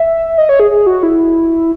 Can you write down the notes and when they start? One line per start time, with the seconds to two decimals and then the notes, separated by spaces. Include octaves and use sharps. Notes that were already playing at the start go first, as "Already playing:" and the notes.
Already playing: E5
0.38 D#5
0.49 C#5
0.60 G#4
0.71 G#4
0.86 F#4
1.03 E4